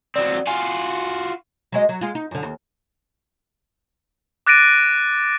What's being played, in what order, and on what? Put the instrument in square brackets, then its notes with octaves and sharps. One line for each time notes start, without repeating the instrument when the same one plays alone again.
[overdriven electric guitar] F#3 C4 [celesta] D5
[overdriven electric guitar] F4 F#4 [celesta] G#5
[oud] F#3 G#3 D#5
F#3
G#3 F4
D#4
F#2 D3
D#2
[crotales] D6 F#6 A6 A#6 D7 D#7